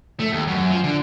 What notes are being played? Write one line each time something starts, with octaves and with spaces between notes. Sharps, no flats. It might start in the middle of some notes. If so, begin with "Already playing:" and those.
A3
D#2
F#2
F3
D3